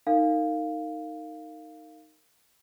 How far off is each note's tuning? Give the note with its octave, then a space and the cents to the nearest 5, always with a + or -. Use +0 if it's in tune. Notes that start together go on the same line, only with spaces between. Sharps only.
D#4 +0 A#4 -35 F5 +0